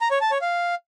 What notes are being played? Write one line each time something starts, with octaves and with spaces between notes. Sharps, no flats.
A#5
C#5
A5
C#5
F5